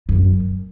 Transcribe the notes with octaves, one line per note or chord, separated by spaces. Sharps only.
F#2